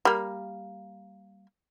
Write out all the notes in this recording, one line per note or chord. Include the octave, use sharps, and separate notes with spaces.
G3 A#3